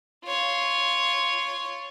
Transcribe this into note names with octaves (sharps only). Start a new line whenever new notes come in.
F4 C#5